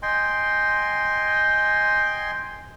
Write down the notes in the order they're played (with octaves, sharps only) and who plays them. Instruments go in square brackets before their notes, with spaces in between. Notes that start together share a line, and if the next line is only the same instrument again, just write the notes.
[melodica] D#5 G5 G#5 C6